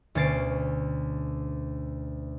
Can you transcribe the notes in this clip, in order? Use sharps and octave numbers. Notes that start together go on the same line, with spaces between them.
D2 B2 C#4 A6 C7 D7